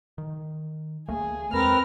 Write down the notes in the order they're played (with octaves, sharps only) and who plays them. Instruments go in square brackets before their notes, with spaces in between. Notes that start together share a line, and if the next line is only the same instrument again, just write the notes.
[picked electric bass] D#3
[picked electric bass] C#2 A3 A#3 [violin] G#4
[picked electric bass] E2 G#3 [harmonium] C4 A#4 B4 [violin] F6 A#6